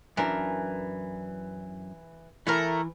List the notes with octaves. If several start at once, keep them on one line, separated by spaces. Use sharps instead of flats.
F#2 E3 D4 A#4
E3 A3 E4 A#4